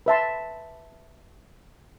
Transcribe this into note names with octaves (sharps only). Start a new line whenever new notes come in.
B4 E5 A5 C6